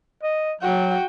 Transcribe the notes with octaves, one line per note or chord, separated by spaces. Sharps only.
D#5
F#3 F#4 G5